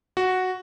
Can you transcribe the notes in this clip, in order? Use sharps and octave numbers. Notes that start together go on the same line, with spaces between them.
F#4